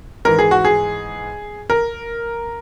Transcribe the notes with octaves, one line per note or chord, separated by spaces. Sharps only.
G#2 E3 A#4
G#4
F#4
G#4
A#4